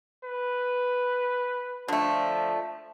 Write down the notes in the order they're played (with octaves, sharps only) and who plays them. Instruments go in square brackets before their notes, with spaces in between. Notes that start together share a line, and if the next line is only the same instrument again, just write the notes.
[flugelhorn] B4
[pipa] D3 A3 [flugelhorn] F3